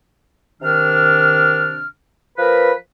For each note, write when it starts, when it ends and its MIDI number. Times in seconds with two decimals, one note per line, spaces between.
0.61 1.87 48
0.61 1.87 51
0.61 1.87 62
0.61 1.87 89
2.37 2.71 53
2.37 2.71 70
2.37 2.71 71